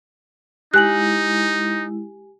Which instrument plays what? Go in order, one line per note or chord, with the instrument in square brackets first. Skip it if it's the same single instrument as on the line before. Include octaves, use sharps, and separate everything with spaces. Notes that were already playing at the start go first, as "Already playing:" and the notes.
[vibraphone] G#3 E4 [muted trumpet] D#4 [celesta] G4 G#5 F#7 [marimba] F#6